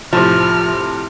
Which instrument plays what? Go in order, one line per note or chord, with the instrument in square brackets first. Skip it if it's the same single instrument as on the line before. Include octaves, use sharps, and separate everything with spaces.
[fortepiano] A2 C3 [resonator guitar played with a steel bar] F3 [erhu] F6